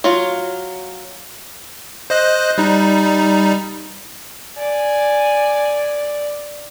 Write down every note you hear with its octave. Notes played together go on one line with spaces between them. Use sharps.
F#3 F4
C5 D#5 F#6
G3 D#4
D5 G#5